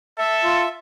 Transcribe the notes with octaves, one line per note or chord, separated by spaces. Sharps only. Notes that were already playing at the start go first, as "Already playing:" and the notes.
A4 E5
F4